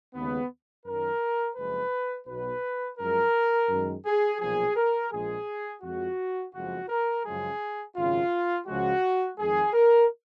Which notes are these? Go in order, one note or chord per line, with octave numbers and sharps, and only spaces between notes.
D#2 C#3 G#3 B3
F#2 D#3 F#3 A#4
F#1 F2 F3 G#3 B4
B1 B2 F#3 B4
F#2 F3 G#3 A#4
F#2 D#3 G#3
G#4
B1 A#2 F3 G#4
A#4
A#1 A#2 F3 G#3 G#4
F2 F3 G#3 F#4
F#1 F2 F3 G#3 F#4
A#4
F#2 C#3 F3 G#3 G#4
G#1 F#2 C#3 F4
C#2 C#3 F3 G#3 F#4
F2 D#3 G#3 G#4
A#4